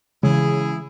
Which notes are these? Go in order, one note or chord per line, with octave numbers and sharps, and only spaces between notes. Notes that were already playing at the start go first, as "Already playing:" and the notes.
C#3 E3 G#3 E4 G#4